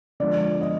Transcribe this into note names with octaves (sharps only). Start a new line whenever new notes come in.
D3 F3 G#3 B3 D5
D#5